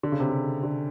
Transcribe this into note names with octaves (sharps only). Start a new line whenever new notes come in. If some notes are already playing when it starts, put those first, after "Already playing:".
D3
C#3
C3
C#3
D3